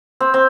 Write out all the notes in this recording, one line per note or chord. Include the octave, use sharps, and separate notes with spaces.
C4
C4